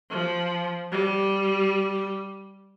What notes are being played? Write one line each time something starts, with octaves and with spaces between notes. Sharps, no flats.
F3
G3